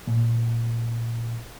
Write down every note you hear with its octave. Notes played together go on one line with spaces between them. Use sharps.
A#2